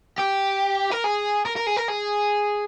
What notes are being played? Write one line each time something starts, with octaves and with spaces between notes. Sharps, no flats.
G4
A#4
G#4
A#4
A#4
G#4
A#4
G#4